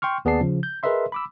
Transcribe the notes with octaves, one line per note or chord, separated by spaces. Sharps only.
G5 C6 C#6 F6
D#2 B3 G#4 D5 A5 C7
C#3 F3
G6
G#4 A#4 B4 D#5 E5 C6
B5 D6 E6